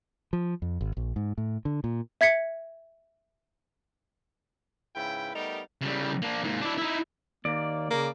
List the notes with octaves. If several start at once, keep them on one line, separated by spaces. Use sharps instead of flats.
F3
F2
G#1
A#1
G#2
A2
D3
A#2
E5 G#6 B6 C#7
G#2 C#3 E4 B4 G5
G3 A3 B3 D#4 G4 A#4
C#3 G3
A#3 D4
G#2 A#3
D4 E4
D#4 E4
D#2 A#3 D5
C#3 A#3